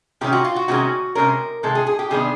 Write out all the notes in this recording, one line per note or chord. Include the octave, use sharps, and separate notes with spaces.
C3 D#3 G#3 C#4 G4
F#4
F4
F#4
C3 D#3 G#3 C#4 F#4
C3 D#3 G#3 C#4 A#4
C3 D#3 G#3 A4
G#4
G#4
G4
C3 D#3 G3 B3 D4 G#4